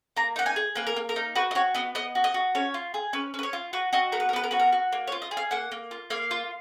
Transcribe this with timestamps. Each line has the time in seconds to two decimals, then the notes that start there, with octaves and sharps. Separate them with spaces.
0.17 A#3 A#5
0.36 D#4 F#5
0.46 G#5
0.56 G#4
0.75 A#3 B4
0.87 A#4
0.96 A#3
1.09 A#4
1.16 D#4
1.35 F#4 B4
1.51 D#5
1.55 F#4 C#5
1.75 B3 D#5
1.95 B3 D#5
2.15 F#4
2.24 D#5
2.34 F#4
2.55 C#4 C#5
2.74 F4
2.94 G#4
3.13 C#4 B4
3.34 C#4 B4
3.43 C#5
3.53 F4
3.73 F#4 B4
3.93 F#4 D#5
4.12 B3 A#4
4.20 B4
4.29 A#4
4.33 B3 B4
4.44 A#4
4.51 F#4 B4
4.60 A#4
4.73 F#4
4.92 A#3
5.07 C#5
5.12 F4
5.22 D#5
5.31 G#4
5.37 F5
5.51 A#3 F#5
5.72 A#3
5.91 F4
6.10 A#3 F5
6.31 F4